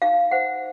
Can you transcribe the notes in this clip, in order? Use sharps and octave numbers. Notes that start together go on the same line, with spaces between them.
D#4 F5
C5 F#5